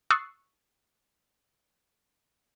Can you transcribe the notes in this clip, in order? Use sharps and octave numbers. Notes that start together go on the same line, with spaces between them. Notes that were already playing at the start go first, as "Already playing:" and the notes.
C#6 D#6 E6 F#6 A6 C7